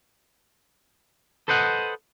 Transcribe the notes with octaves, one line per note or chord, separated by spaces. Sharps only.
A4 B4 C5 D#5 F#5